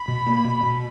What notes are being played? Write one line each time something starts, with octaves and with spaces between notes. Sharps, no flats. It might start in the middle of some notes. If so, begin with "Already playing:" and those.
Already playing: B5
B2
A#3
B2
B2